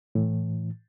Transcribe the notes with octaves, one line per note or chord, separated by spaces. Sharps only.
A2 E3